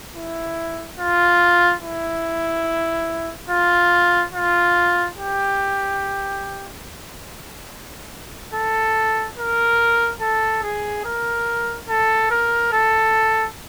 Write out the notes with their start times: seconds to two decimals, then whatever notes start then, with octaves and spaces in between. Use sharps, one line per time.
0.14 E4
0.98 F4
1.82 E4
3.50 F4
4.33 F4
5.18 G4
8.53 A4
9.37 A#4
10.21 A4
10.63 G#4
11.05 A#4
11.88 A4
12.31 A#4
12.72 A4